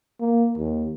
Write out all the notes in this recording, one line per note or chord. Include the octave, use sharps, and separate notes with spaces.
A#3
D#2